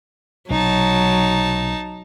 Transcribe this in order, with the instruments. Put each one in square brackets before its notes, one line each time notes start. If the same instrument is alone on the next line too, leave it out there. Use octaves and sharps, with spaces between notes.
[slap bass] B1 C3 [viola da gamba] F#3 [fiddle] D#4 A5